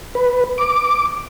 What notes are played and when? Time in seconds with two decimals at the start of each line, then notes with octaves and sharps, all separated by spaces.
0.15 B4
0.58 D6